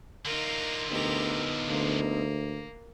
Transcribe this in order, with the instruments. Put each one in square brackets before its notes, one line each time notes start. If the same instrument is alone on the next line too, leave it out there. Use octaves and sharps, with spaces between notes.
[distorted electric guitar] D3 F4 [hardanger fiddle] D#4 A#4
[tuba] D2 [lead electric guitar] B3 D#4 [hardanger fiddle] G4 A#4
[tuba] D2 [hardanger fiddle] A#3